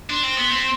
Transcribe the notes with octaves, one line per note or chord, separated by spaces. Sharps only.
D4 C6
C4
B3
C4